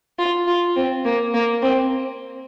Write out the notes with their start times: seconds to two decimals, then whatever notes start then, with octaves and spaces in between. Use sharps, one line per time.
0.19 F4
0.48 F4
0.76 C4
1.05 A#3
1.34 A#3
1.62 C4